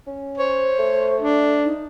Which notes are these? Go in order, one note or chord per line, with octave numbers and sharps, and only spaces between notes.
C#4
C5 C#5
A3
D4
D#4